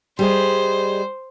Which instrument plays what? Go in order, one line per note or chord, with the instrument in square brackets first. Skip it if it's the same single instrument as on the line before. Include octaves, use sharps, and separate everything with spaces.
[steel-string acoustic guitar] G3 G#4 D#5 [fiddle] C5